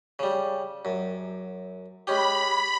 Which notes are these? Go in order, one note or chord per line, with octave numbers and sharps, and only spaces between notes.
C#3 G3
F#2
G#3 C#4 G4 B5